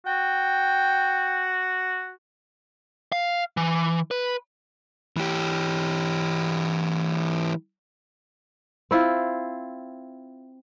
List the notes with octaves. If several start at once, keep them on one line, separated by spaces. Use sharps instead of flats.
F#4 G5
F5
E3
B4
E3 G4
C4 E4 F4